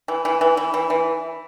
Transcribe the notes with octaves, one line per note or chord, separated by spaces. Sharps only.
E3
E3
E3
E3
E3
E3